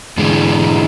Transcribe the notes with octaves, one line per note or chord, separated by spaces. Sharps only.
G#2 D3 E3 G#3